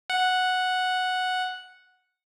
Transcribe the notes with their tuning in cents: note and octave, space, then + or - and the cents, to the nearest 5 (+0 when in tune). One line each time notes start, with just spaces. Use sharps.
F#5 -5